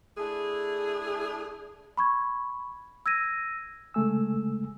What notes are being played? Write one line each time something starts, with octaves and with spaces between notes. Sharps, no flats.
A3 D4 E4 G#4
B5 C#6 G#6
E6 G#6 A#6 D#7
C#3 G#3 A3 G#5 E6